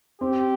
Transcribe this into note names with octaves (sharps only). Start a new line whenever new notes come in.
C4 G4